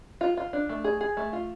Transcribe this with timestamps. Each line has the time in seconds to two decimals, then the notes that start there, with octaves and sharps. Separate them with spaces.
0.21 F4
0.37 F4
0.53 D4
0.69 A3
0.84 G#4
1.01 G#4
1.17 A3
1.33 F4